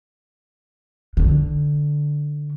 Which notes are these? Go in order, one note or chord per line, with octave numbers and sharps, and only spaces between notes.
D3